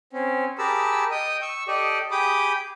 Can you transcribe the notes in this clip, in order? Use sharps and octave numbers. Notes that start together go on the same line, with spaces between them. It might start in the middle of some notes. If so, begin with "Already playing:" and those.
C4 C#4
G4 G#4 A#4 A5 B5 E6
D#5 G5 D#6
C#6 E6
G4 A4 D5 D#5
G4 G#4 G5 B5 D6 D#6